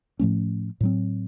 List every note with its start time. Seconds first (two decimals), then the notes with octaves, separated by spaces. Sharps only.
0.19 A2 F3 A3 C#4
0.80 A2 F#3 C4